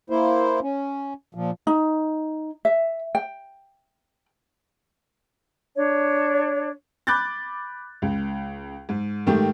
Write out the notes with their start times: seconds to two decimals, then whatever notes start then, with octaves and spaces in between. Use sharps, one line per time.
0.10 A#3 E4 C5
0.62 C#4
1.35 A#2 F3
1.67 D#4
2.65 E5
3.15 G5
5.75 D4 C#5
7.07 B5 D6 F#6 G6 A6
8.02 C#2
8.89 G#2
9.27 G#2 D#3 A3 G4